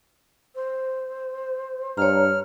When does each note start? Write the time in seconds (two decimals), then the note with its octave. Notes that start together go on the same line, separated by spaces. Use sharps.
0.55 C5
1.97 G2 C#5 A#5 F6